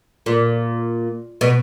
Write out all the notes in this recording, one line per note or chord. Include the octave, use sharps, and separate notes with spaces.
A#2
B2